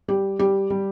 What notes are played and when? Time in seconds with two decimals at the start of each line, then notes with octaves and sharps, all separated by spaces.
0.08 G3 G4
0.39 G3 G4
0.70 G3